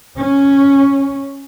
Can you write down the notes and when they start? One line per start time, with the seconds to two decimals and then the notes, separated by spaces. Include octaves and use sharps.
0.18 C#4